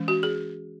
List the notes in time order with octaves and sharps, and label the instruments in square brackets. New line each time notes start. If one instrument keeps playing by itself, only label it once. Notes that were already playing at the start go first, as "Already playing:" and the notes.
Already playing: [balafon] E3 G#3 C#4
F#4
G#4